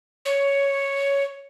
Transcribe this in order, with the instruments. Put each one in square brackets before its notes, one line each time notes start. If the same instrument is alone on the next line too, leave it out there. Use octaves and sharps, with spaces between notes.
[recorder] C#5